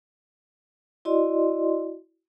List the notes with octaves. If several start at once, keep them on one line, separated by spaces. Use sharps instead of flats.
E4 F#4 D5 D#5 C6